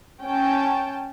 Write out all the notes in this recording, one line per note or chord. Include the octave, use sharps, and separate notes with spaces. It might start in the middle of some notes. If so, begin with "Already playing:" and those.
C#4 G5 A5